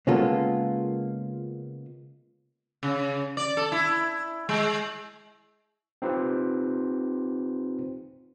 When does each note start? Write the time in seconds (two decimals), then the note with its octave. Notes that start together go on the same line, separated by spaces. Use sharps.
0.07 C#3 G#3 A#3 B3 F4 A4
2.83 C#3
3.37 D5
3.57 A4
3.72 E4
4.49 G#3
6.02 C4 D#4 F4 G4 B4 C5